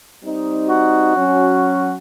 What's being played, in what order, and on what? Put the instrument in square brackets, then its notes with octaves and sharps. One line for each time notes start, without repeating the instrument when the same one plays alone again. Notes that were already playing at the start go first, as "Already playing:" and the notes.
[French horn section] G3 C4 D#4
[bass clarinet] F#4
[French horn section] F#3 C#4